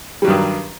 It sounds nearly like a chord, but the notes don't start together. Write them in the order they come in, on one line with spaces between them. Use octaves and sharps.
G3 F#3 G2 D#3